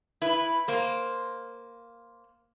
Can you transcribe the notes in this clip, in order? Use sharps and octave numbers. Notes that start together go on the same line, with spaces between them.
E4 B4
A#3 C5